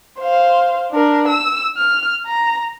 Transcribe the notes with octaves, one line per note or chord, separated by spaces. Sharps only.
C5 F5
D4 A#4
E6
F6
A#5